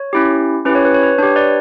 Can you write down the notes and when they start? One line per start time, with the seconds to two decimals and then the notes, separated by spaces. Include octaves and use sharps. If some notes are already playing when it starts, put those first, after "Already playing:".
Already playing: C#5
0.13 C#4 E4 G4
0.65 C#4 E4 G4 B4
0.75 C#5
0.85 B4
0.94 C#5
1.03 B4
1.18 D4 G4 C#5
1.36 B4 D5